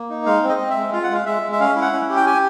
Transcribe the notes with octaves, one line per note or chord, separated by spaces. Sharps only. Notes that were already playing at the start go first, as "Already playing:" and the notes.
Already playing: A#3
D#4
G#3 F5
C4
D#5
C4
E5
G#3
F4 F5
F#5
G#3 F5
G#3 E5
G#3
E5
C#4 F5
E4
F#5
C#4
G4
G5
G4 G#5